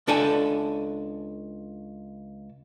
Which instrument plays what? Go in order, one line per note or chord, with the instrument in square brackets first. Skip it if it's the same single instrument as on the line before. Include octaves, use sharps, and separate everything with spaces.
[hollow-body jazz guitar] C#2 D4 A4 G#5